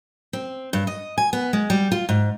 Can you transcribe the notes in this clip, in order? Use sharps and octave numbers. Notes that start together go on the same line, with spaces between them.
C4
G2
D#5
G#5
B3
G#3
G3
F4
G#2